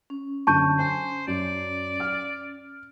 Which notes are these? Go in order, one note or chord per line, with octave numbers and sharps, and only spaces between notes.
C#4
F#2 D3 A5 C#6 G6 D#7
C5 G#5
F#2 D5
F6